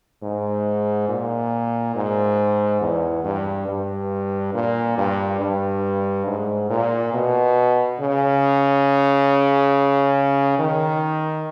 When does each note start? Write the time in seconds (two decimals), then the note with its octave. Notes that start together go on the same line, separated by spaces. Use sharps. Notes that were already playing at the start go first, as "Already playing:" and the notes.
0.23 G#2
1.09 A#2
1.96 G#2
2.82 E2
3.25 G2
3.68 G2
4.55 A#2
4.98 G2
5.41 G2
6.27 G#2
6.70 A#2
7.13 B2
8.00 C#3
10.59 D#3